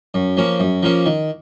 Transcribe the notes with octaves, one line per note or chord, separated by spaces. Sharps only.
F#2
F3 A#3 C#4
F#2
F3 A#3 C#4
D#3